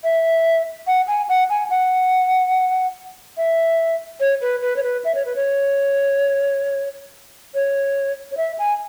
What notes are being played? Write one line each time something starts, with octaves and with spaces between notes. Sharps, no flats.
E5
F#5
G#5
F#5
G#5
F#5
E5
C#5
B4
B4
C#5
B4
E5
C#5
B4
C#5
C#5
C#5
E5
G#5